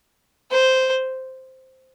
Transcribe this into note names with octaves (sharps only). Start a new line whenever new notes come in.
C5